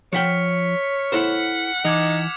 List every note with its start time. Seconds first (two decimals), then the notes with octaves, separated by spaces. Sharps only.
0.13 F3 C#5 F#5 G5 F6 B6 C#7
1.12 E4 A4 C5 F#5
1.85 E3 D#4 D6 G#6 F7